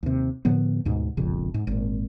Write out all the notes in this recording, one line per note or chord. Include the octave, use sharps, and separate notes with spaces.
D#2 C3
A2 D3 F3 B3
D2 G#2 B2
E1 A#1 F2 C#3
G#2
G#1 A#2